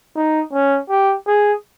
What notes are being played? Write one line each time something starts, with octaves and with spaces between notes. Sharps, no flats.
D#4
C#4
G4
G#4